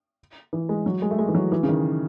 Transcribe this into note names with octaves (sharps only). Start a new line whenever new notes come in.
E3
G#3
F#3
G#3
A3
G#3
E3
F#3
E3
C#3
D#3